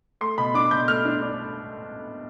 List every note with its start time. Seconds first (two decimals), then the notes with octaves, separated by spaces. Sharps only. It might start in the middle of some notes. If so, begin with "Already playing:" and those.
0.21 A3 C6
0.38 B2 B5
0.54 D4 D6
0.71 B2 G6
0.88 A3 F6
1.05 D4
1.22 D4